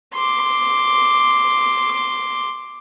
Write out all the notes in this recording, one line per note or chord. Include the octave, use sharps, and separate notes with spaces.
C6 D6